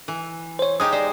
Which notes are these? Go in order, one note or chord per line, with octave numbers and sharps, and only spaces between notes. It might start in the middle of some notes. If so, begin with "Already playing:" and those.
E3
C5 C#5
G#3 D#4 G4 D#6
C5 D5